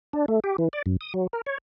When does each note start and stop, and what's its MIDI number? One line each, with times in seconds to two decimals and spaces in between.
0.13 0.26 62
0.28 0.40 57
0.44 0.56 67
0.58 0.68 52
0.73 0.82 74
0.86 0.97 42
1.01 1.13 87
1.14 1.27 54
1.33 1.41 70
1.46 1.58 73